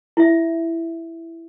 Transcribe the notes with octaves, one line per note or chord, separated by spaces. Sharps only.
E4 E5